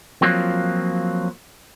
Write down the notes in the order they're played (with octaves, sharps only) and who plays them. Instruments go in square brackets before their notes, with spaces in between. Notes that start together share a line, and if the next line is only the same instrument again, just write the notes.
[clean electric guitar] F3 F#3 A#3 C4 F4